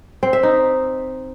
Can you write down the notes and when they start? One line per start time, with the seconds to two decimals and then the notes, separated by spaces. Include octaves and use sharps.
0.23 C4
0.33 E5
0.43 D#4